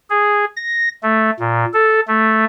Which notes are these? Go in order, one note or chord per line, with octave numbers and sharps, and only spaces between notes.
G#4
A#6
A3
A#2
A4
A3